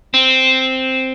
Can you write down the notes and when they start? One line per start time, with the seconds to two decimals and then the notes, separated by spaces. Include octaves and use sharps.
0.14 C4